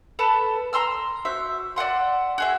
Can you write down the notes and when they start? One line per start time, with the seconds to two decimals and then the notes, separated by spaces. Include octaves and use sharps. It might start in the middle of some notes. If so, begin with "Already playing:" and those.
0.19 A4 B4 A5 B5
0.73 A#5 C6 E6 F6
1.25 F#4 C5 E5
1.76 D5 E5 F#5 C6
2.38 F#4 G#4 E5